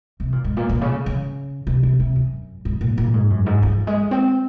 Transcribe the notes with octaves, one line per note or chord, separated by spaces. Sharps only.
C3
A#2
G#2
A#2
A#2
C#3
C#3
C3
C3
C3
F#2
G#2
A#2
A#2
G#2
F#2
G#2
F3
G#3
C4